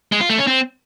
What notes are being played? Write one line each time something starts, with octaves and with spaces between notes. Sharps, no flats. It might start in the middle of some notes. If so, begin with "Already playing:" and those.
G#3
F4
A3
C#4
C4